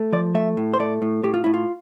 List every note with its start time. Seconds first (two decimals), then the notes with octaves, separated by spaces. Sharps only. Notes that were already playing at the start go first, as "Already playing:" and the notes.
Already playing: A3
0.13 F3 D5
0.35 A3 E5
0.57 A2
0.74 C5
0.79 A3 D5
1.02 A2
1.23 A2 G4
1.34 F4
1.44 A2 E4
1.54 F4